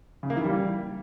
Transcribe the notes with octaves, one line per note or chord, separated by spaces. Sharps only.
C#3
A#3
E3
G3